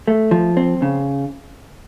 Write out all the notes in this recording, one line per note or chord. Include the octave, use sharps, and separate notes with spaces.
A3
F3
C4
C#3